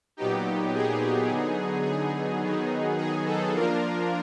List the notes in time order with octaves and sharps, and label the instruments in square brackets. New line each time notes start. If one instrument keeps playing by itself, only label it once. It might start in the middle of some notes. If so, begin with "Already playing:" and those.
[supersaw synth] A#2 F#3 B3 D#4 G4
G#4
D3 F#3 B3 D#4
G#4
D#3 F#3 B3 D#4
G#4
A4
F3 A#3 D4 F4 A#4